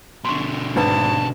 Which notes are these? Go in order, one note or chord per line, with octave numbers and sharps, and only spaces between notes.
B2 D3 C6 C#6
G#1 D4 B4 A5 C#6